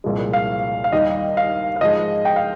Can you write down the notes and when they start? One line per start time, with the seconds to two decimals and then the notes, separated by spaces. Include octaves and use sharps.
0.04 C2 A#2 F3 G#3
0.33 F5
0.84 F5
0.92 D#2 D#3 G3 D#5
1.37 F5
1.76 F5
1.81 G#2 F3 G#3 D#5
2.25 G5
2.36 F5